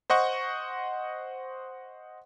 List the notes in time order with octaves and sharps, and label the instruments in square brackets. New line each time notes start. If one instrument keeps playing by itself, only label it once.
[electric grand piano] C5 D#5 F#5 C#6